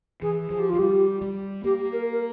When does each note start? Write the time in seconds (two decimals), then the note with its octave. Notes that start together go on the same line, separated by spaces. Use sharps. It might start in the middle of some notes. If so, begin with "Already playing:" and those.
0.22 E3 G#4
0.50 F3 G#4
0.59 G4
0.69 F4
0.74 F3
0.79 G3 G4
1.22 G3
1.64 A#3 G4
1.93 A#4
2.13 A#4